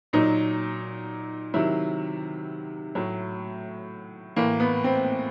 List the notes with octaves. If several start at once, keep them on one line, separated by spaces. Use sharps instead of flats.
A#2 F#3 D#4
C3 D#3 F#3 E4
A2 F#3
A2 E3 A#3
B3
C4